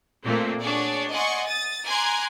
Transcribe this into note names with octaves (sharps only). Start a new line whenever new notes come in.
A#2 A3 A#3 C4
D4 F#4 G#4 C#5 D5
D5 D#5 F#5 G#5 C6 C#6
D#6 A6
G#5 A#5 C6 D6 F#6 G#6